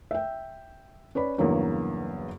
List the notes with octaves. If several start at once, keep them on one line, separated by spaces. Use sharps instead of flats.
E5 G5
C#4 B4 D5 B5
E2 G2 C#3 F#3 A#3 C#4